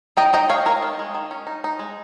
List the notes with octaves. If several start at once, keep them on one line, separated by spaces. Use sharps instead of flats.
D#4 D#5 G5
D#4 D#5 G5
G#3 C#5 F5
G#3 A#4 C#5
D#3
G#3
D#3
C#4
D#4
D#4
G#3